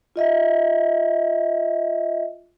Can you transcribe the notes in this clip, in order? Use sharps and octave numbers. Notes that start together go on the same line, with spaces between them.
F4 D#5 E5